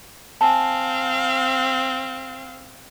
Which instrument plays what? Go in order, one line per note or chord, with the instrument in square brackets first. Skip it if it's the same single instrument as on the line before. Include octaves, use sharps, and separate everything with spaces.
[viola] C4 F5 [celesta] G#5 A5